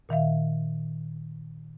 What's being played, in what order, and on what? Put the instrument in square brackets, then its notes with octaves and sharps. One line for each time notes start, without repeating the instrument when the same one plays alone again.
[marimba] A#2 D#3 E5 F5